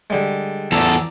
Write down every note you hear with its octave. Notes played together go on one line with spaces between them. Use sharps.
D3 G3 G#3
E2 A4 D5 A#5